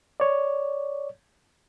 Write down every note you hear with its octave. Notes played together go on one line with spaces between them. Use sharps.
C#5 D5